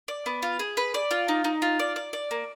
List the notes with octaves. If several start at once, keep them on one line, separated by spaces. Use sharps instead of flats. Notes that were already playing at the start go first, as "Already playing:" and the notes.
D5
B3
F4
G#4
B4
D5
F4
D#4
D#4
F4
D5
D5
D5
A#3